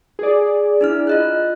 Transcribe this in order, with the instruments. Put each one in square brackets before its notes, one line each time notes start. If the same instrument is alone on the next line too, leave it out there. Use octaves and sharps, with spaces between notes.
[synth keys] G#4 D5
[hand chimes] D4 E4 F6
F4 D#5 F#6